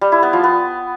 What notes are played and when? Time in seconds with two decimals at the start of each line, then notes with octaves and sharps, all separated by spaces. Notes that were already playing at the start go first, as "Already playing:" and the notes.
0.01 G3
0.12 E4
0.23 B3
0.33 F3
0.44 B3